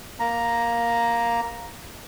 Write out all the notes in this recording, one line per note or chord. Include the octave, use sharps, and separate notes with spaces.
A#3 A#5